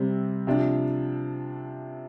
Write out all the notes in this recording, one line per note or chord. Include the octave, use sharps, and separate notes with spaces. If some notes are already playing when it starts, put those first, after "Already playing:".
Already playing: C3 G3 C4
C3 F3 D4